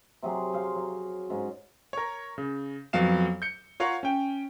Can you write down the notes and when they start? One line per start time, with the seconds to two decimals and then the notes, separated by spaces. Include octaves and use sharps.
0.23 C3 F#3 G#4
0.53 C5 F5
0.75 F#3
1.29 G#2 C#4
1.93 A#4 C#5
2.38 C#3
2.93 F2 F#3 B3 F5 E7
3.42 G6 C#7
3.80 F4 A#4 C#5 F5 F#5
4.03 C#4 G5